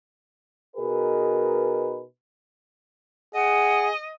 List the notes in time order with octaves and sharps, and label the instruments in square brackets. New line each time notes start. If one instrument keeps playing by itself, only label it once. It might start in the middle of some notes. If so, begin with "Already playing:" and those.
[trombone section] B2 D#4 G#4 A#4 B4
[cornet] G#4 [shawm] D#5 [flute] F#5